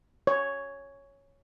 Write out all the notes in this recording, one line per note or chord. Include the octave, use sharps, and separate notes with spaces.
C#5